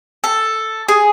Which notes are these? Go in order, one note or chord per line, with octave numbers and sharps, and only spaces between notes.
A4
G#4